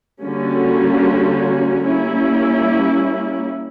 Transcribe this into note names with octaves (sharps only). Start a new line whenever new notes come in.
D3 G3 A#3 C#4 F#4
G3 A#3 C#4 E4